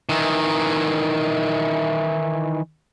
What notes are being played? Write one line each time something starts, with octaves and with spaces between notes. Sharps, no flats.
D#3 E3